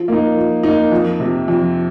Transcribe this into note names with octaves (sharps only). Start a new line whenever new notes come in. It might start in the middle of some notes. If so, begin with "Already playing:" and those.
Already playing: F3
A#3 D#4
F3
A#3 D#4
F2
C3 F3
F2